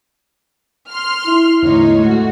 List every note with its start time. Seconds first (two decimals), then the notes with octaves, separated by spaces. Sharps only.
0.89 C6 F6
1.26 E4
1.63 E2 A2 D3 D#4 C#5 D#5
1.99 G#3 A3 F#4